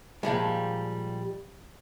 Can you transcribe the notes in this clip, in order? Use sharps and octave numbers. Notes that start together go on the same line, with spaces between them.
A#2 F3 G3 G#3